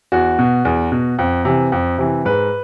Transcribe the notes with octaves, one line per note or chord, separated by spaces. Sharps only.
E2 F#4
B2
E2
B2
F2
C3 E3
F2
C3 E3
G#2 B4